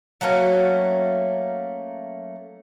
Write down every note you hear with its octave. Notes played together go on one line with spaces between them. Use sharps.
F#3 A3 A#3 C#4